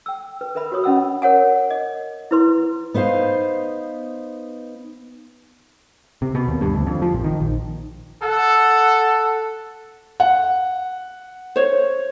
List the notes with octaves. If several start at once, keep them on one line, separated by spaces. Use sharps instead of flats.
G5 E6
B4
A#4 B4 E5 B5
F#4 A#4 C#5 D#6
C#4 D#5 E5 F#5 B5 E6
A#4 C#5 F#5 G#5
D#5
E4 B4 C6
B3 D#4 C5 F5
C3
B2
D#2
G2
D2
F2
F3
A#1
D#3
A#1
A4 F#5
F#5
C5 C#5